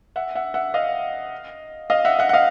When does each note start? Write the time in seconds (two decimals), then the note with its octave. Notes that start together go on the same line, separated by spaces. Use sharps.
0.16 E5 F#5
0.35 E5 F#5
0.54 E5 F#5
0.74 D#5 F5
1.90 D#5 F5
2.05 E5 F#5
2.19 E5 F#5
2.29 F#5
2.33 D#5 F5